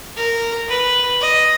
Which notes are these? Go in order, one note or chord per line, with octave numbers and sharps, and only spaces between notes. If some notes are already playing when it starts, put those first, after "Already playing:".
A#4
B4
D#5